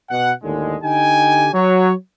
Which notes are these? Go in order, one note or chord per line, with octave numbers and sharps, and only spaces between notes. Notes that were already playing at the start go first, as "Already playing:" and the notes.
B2 F#5
D#2 A2 D3 G#3
D3 D#4 G4 G5 G#5
F#3 C#5